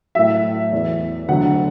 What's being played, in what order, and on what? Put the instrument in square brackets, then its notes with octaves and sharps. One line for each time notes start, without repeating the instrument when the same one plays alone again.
[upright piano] A2 F#3 E5
E2 E3
D2 D3 F#3 F#5